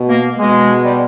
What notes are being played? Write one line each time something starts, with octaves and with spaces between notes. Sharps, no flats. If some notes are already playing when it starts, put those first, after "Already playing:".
Already playing: B2
A#3
B2 G#3
G3